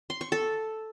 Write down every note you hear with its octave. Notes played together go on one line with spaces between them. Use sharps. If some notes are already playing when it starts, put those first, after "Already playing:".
C6
C#6
A4